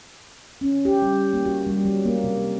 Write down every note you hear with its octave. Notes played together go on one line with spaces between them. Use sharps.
C#4
G4
G3
A#3
F#4
G3
F#3
A#3
C3